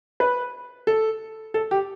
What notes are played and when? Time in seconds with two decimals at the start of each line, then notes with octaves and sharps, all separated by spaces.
0.20 B4
0.87 A4
1.54 A4
1.71 G4